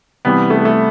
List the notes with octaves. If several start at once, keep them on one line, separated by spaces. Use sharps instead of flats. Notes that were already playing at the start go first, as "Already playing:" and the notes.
C3 E3 G3 B3
A3
A3